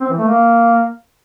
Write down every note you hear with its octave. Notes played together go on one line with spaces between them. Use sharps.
C4
E3
A3
A#3